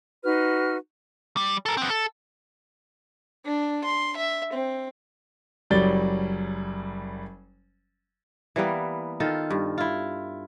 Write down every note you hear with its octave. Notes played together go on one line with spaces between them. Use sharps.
D#4 F#4 B4 F6
G3
A4 A#4
B3 C4
A4
D4
C6
E5
C4
F#1 F#3 G3 D5 A6 G7
E3 G3 A#3 B3
D#3 F4 A4
G2
E4 F4